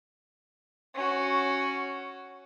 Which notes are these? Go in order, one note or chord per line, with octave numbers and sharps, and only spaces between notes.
C#4 F#4